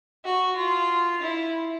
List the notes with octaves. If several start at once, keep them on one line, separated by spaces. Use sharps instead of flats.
F#4
F4
E4